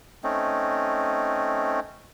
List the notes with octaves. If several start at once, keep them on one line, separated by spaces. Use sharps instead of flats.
A3 C4 C#4 D#4